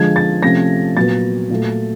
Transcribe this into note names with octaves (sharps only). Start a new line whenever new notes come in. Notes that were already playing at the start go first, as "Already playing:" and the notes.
Already playing: D3 F3 G#3 G#6
A6
C3 F3 A3 C#4 A#6
A#2 F#3 B3 A6
A#2 F#3 A3